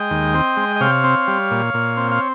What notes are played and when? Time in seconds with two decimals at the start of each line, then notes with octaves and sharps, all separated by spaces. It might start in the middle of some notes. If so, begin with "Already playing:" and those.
Already playing: G#3 D#5 G5
0.11 D#2
0.34 C4
0.57 G#3
0.76 D#5
0.80 C3 C#5 F5
1.04 C4
1.28 G3
1.51 A#2
1.74 A#2
1.97 C4
2.11 F5